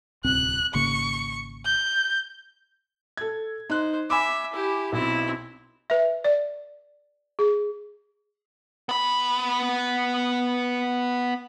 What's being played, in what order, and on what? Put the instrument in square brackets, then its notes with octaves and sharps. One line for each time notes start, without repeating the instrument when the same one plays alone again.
[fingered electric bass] D1 C2 C4 [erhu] F#6
[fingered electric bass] G#1 C#3 A#3 [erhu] C#6
[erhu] G6
[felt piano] A4 G#6
[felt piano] D#4 F#6 [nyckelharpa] C5
[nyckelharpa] E5 [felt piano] G#5 B5 D6
[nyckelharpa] E4 G4
[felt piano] B1 [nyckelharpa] C4 E4
[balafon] B4 E5
D5
G#4
[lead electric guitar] B3 B5